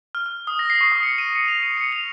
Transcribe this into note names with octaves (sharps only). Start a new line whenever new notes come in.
F6
F6
D#6
A#6
C7
C#6
D#6
C#7
D#7
C#7
F7
D#7
C#7
F7